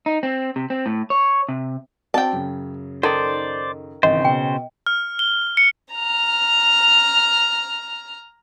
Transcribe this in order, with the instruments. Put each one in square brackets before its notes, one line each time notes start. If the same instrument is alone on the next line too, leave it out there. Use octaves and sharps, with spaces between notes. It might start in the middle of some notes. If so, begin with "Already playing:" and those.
[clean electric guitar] D#4
C4
C3
C4
A2
C#5
C3
[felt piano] C4 F#4 D5 [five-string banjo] G5 A5
[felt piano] F#2 C#3
[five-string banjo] D#3 [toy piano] D#4 A4 [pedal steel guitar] C5 D5
[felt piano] G#1 E3 G5 [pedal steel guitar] C#3 C5 [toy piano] D#5
[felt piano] B2 [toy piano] G5
[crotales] F6
G7
C#7
[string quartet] A#5 F6